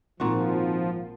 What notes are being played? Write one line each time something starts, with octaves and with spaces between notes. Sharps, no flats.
G#1 A#2 F3 F#4